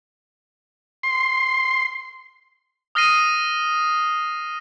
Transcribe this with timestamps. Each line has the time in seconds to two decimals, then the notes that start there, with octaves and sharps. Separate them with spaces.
1.03 C6
2.95 D#6 F6 A#6 C7 D#7